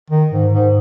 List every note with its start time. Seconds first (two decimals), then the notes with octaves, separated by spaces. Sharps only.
0.10 D#3
0.32 G#2
0.53 G#2